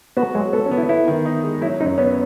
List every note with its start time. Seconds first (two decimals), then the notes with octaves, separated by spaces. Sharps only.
0.17 B3 F#4
0.35 F#3 G#3
0.53 B3 A4
0.66 C#4
0.71 B3
0.77 E4
0.89 B3 E4
1.07 D#3
1.25 D#4
1.44 G#3
1.61 F#3 E4
1.80 F#2 D#4
1.98 B3 C#4